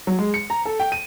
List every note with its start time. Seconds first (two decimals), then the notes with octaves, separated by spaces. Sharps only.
0.07 F#3
0.19 G#3
0.34 C#7
0.50 A#5
0.65 A4
0.80 G5
0.92 D#7